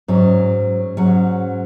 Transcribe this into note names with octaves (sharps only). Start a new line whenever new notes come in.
G#2 F#3 C#4
G#2 F#3 C#4